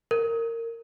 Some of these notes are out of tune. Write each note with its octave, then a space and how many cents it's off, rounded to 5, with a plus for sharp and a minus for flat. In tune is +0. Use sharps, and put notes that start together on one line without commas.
A#4 -20